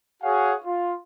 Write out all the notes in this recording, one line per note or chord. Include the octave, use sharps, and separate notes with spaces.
F#4 G#4 C#5 F5 F#5 G#5
F4